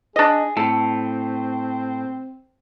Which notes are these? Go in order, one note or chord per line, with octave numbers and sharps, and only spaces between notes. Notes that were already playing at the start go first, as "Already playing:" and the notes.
D4 G#4 D#5
A2 C4 A4